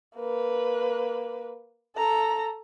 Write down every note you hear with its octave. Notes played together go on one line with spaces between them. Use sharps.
A#3 B4
A4 A#5